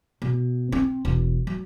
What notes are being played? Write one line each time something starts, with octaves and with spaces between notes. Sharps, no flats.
B2
C4
E1
F#3